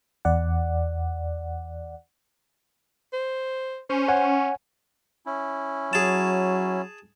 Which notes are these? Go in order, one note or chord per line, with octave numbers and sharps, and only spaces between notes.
E2 D5 F#5
C5
C#4 C5
C#5 F#5 G#5
C#4 E4
F#3 G#4 A5